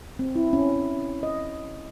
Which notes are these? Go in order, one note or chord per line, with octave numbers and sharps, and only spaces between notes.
C4
E4
C#4
D#5